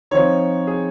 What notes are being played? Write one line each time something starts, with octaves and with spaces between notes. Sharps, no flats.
F3 C4 D#4 C#5
G#4